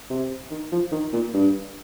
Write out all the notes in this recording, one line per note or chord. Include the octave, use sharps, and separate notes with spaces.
C3
D#3
F3
D#3
A#2
G2